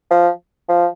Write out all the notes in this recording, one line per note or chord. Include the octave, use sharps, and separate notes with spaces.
F3
F3